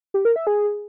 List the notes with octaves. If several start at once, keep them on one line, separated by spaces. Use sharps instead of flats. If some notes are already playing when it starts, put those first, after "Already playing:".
G4
A#4
E5
G#4